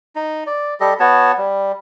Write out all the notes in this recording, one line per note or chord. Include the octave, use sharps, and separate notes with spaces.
D#4
D5
G3 G4 A4 D#5
B3 F#4 C#5 A5
G3